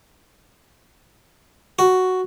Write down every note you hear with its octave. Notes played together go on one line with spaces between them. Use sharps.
F#4